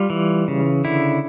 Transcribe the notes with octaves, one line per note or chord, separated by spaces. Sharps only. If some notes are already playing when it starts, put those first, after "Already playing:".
Already playing: G3 F4
E3
C#3
D3 E4